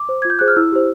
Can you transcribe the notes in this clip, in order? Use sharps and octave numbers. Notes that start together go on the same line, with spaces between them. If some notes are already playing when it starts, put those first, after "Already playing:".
Already playing: D6
C5
F4 G#6
G6
G#4 C5 F#6
F6
E4 E6
G4 C5